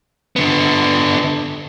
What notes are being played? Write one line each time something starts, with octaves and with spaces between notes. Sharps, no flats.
D3 B3